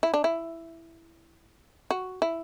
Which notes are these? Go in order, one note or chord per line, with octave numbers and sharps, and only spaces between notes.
E4
D4
E4
F#4
E4